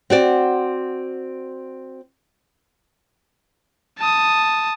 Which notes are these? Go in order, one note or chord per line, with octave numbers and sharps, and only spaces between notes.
C4 F#4 D5
A5 D#6